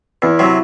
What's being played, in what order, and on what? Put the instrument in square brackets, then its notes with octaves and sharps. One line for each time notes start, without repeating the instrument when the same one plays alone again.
[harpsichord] E2 [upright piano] E4
[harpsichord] C3 F#3